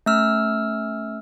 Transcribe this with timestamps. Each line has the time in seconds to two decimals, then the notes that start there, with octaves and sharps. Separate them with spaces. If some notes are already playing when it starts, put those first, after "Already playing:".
0.06 A3 C#4 E6 F6